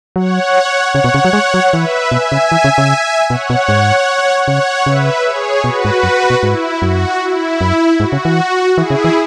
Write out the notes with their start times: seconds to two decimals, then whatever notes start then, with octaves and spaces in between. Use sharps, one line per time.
0.16 F#3 C#5 F#5
0.94 C#3 C#5 F#5
1.04 B2
1.14 C#3
1.25 F#3
1.33 G#3
1.54 F#3
1.73 E3 B4 E5
2.12 B2 E5 G#5
2.32 C#3
2.52 E3
2.64 C#3
2.78 C#3
3.29 B2 C#5 F#5
3.50 B2
3.69 G#2
4.47 C#3 C#5 F#5
4.86 C#3 B4 E5
5.25 G#4 C#5
5.64 B2 F#4 B4
5.85 G#2
6.03 F#2
6.30 B2
6.43 G#2 E4
6.82 F#2 F#4
7.21 E4
7.61 F#2
7.99 G#2 F#4
8.12 C#3
8.25 E3
8.77 E3 E4 G#4
8.90 C#3
9.04 E3